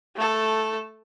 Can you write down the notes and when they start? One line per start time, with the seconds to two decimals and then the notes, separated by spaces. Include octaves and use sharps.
0.16 A3 A4